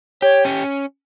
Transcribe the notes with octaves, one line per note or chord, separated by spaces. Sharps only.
G4 C#5
C#4